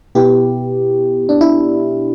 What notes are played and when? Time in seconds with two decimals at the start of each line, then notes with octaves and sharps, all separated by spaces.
0.15 B2 B3 E4 G4
1.29 D4
1.41 E4